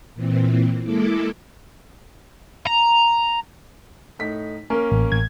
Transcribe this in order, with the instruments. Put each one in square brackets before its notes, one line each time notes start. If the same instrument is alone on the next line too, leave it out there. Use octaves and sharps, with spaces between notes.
[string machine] A#2 E3 C4
G#3 A#3 E4 A4 D6
[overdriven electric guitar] A#5
[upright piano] A2 D#4 B6
A#3 C#4 A#4
[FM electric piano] A1
A1 G#6